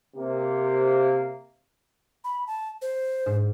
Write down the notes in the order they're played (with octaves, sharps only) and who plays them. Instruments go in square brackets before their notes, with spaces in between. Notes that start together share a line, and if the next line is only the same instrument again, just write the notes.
[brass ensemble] C3 A#3
[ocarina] B5
A5
C5
[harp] G#2